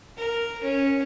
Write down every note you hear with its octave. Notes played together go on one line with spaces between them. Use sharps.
A#4
C#4